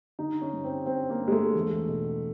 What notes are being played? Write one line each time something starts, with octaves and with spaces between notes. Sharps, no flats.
D3 D#4
C#4
G2
C4
G2 C4
A#3
G2
G#3
A3
E2
B2